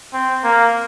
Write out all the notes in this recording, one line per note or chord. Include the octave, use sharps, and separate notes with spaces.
C4
A#3